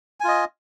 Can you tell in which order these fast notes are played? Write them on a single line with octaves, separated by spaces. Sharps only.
G#5 F4 D#5